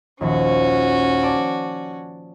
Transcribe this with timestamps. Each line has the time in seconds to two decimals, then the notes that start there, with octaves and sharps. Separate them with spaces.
0.21 A#1 D#2 C#4 F#4
1.23 D5 A5 D6